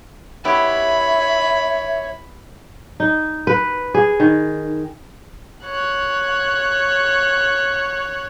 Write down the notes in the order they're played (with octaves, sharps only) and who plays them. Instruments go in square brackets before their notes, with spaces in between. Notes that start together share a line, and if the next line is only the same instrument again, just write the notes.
[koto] B3 E4 G4 [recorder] C#5 [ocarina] E5 [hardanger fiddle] B5
[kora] D#4
B4
G#4
D#3
[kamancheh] C#5 F#6